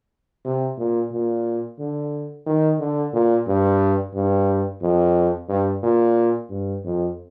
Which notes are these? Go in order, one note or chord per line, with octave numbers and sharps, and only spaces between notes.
C3
A#2
A#2
D3
D#3
D3
A#2
G2
G2
F2
G2
A#2
G2
F2